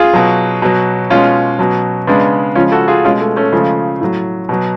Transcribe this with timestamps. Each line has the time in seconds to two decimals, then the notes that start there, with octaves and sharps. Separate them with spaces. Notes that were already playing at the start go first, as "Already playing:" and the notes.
Already playing: F4 G#4
0.13 B2 F#3
0.62 B2 F#3
1.10 B2 G#3 C#4 F4
1.59 B2 F#3
2.07 C#3 G#3 B3 D4
2.55 C#3 F3 G#3 C#4 F4
2.72 F#4 A4
2.88 F4 G#4
3.04 B2 G#3 C#4 F4
3.20 A3
3.36 A3 C#4
3.53 C#3 F3 G#3 A3
4.01 A2 F#3
4.49 B2 F#3